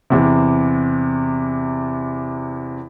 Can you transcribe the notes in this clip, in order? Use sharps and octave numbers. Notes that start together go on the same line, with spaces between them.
E2 C3